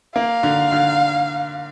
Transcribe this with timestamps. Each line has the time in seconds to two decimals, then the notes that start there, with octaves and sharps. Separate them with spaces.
0.15 A#3 F5
0.43 D3
0.72 D3